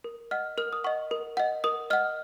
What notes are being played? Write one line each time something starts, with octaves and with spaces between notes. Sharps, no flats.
A#4
D#5 F#5 F6
A#4 F6
D#6
D#5 F#5 C#6
A#4
D#5 F#5
A#4 D#6
D#5 F#5 F6